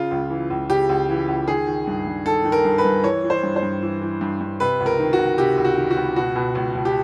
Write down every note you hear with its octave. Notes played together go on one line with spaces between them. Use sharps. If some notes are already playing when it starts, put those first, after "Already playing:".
Already playing: C#3 F4
C#2
E3
C#2
C#3 G4
C#2
E3
C#2
D#3 G#4
D#3
G2
G2
D#3 A4
D#3
A#4
G2
B4
G2
E3 C#5
E3
C5
G2
C5
G2
E3
E3
G2
G2
C3 B4
C#2
A#4
D#3
F#4
C#2
C3 G4
C#2
F#4
D#3
F#4
C#2
B2 F#4
B2
C#2
C#2
G4